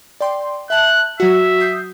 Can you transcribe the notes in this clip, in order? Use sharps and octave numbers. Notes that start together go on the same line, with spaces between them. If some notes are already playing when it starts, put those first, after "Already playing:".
D5 G5 C6
E5 A5 F#6 G6
F#3 F#4 E5
D#6 G6 C7